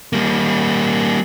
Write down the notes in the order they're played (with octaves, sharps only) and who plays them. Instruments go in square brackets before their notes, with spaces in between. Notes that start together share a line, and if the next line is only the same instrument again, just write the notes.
[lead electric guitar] G3 A#3